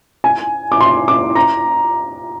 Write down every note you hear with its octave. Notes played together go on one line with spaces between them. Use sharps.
G#5
D6
C6
D6
A#5